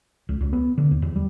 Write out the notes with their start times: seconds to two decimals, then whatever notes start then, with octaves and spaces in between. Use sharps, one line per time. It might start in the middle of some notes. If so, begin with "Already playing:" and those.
0.29 C#2
0.41 C#2
0.53 B3
0.78 D3
0.91 D#2
1.02 E2
1.16 G3